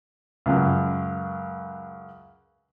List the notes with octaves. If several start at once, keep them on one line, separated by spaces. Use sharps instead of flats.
C#2 F#2